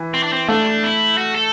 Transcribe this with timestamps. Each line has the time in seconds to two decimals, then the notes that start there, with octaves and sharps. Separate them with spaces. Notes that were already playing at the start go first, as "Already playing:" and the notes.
Already playing: E3
0.14 C4
0.23 D4
0.33 C4
0.48 A3 D4
0.83 E4
1.18 F#4
1.35 A4